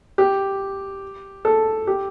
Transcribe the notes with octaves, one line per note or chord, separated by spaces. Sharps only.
G4
A4
G4